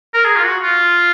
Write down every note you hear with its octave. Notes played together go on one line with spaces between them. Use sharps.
A#4
G#4
F4
F#4
F4